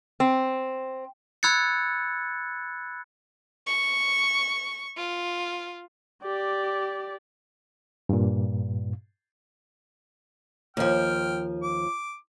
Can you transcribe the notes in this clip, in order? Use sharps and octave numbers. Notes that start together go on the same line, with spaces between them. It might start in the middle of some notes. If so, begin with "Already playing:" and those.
C4
B5 E6 F#6 G#6 A6 C#7
C#6
F4
G4 D5
G2 A#2
D#2 F3 G5 F6
D6